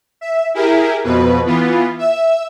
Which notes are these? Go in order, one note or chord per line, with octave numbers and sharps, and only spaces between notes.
E5
E4 G4 G#4 A#4
F2 B2 B4
E3 B3 F4
E5 E6